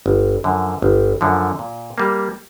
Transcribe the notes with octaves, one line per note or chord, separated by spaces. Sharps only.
G1
F#2 D3 F3
G1
F#2 D3 F3
A#2
G3 A#3